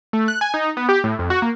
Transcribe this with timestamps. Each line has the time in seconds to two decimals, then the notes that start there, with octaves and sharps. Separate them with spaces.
0.13 A3
0.28 F#6
0.41 G#5
0.54 D#4
0.77 B3
0.89 G4
1.04 A2
1.19 F2
1.30 F#4
1.42 A#3